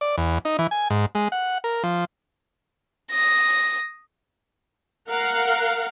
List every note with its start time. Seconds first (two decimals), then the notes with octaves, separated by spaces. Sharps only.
0.01 D5
0.18 E2
0.45 D#4
0.59 E3
0.71 G#5
0.90 G#2
1.15 G#3
1.32 F#5
1.64 A#4
1.84 F3
3.12 D#6 A#6
5.09 A#4 F5 F#5